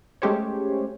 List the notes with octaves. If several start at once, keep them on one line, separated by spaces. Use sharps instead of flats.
G#3 A3 C#4 G4 C5 C#5